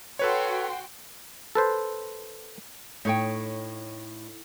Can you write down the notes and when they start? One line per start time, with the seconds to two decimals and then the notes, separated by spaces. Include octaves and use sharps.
0.19 F#4 A4 B4 C#5 G5 C6
1.55 A4 B4 C5
3.05 A2 D#4 C#5 G5